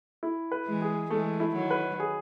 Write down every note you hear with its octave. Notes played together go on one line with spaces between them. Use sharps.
E4
B4
E3 G#3
G#4
E3 G#3 A3
E4
D#3 F#3
B4
G#4